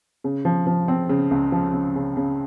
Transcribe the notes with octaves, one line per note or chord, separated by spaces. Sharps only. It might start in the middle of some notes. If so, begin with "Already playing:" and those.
C#3
F3
F3
C4
C#3
C#2
F3
C#3
C#3
C#3